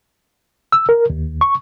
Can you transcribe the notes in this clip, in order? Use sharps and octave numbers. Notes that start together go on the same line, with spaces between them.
E6
A#4
D#2
C#6